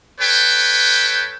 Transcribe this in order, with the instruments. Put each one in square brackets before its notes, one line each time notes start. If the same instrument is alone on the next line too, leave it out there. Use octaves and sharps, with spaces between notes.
[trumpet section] A4 B4 C#5 G5